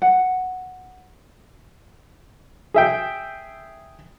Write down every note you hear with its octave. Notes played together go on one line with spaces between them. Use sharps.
F#5
G#4 E5 G5